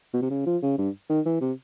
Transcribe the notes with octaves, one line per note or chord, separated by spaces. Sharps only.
B2
C3
C#3
F3
C#3
G2
D#3
E3
C3